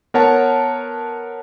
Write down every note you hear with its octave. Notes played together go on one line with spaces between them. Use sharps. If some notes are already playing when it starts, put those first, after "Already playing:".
B3 A#4 C#5 F#5 A5